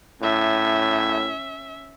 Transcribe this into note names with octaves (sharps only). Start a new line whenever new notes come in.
A2 C#4 E5